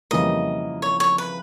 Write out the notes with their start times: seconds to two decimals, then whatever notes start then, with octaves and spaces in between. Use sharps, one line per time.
0.11 F2 C#3 E3 G3 A#3 D#5
0.82 C#5
1.00 C#5
1.18 B4